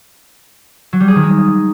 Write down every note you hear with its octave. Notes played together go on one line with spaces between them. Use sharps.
F#3
G3
G#4
D#3
G#3